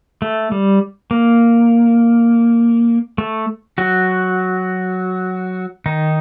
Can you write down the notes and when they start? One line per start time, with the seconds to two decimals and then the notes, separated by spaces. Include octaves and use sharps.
0.22 A3
0.52 G3
1.11 A#3
3.18 A3
3.78 F#3 F#4
5.86 D#3 D#4